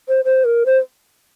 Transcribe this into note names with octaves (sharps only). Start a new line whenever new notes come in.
C5
C5
A#4
C5